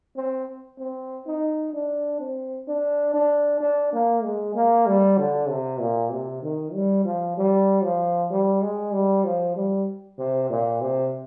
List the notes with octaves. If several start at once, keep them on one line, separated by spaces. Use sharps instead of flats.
C4
C4
D#4
D4
C4
D4
D4
D4
A#3
G#3
A#3
G3
D3
C3
A#2
C3
D#3
G3
F3
G3
F3
G3
G#3
G3
F3
G3
C3
A#2
C3